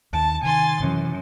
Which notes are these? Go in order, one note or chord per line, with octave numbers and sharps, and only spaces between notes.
D#2 D#3 A5
C3 D#3 G#5 C6 A6
F#2 C3 D#3 E3